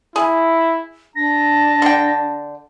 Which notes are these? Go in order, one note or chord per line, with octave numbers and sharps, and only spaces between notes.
E4 G#4
D4 A5 A#6
D3 G5